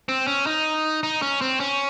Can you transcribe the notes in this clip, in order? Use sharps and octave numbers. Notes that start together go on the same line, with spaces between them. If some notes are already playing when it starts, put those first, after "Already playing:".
C4
C#4
D#4
D#4
C#4
C4
C#4